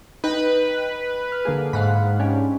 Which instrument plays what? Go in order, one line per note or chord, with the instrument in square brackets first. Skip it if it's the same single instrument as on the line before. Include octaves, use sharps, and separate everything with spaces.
[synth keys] D#4 G5 [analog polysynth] B4
[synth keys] F6
D3 A#3 G#4
[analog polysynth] G#2 [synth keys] F5 F#5 B5
[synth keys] C#4 D4 G4